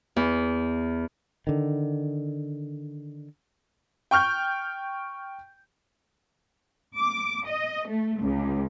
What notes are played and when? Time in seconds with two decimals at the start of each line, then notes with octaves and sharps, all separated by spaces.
0.16 E2
1.47 D3 D#3
4.11 G5 C#6 F6 G6
6.96 D6
7.47 D#5
7.87 A3
8.21 C#2